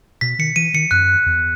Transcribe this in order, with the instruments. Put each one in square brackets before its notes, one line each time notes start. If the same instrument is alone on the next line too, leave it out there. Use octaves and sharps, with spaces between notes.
[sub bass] B2 [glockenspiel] B6
[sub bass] D#3 [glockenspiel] C#7
[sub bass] E3 [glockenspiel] D#7
[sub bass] D#3 [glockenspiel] C#7
[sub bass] F#2 [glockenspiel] F#6
[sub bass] E2